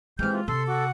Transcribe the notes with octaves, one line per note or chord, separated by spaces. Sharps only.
C3 E3 G#3 A#3 F6 G6
F4
C3 A4 C6
F#4 F#5 D6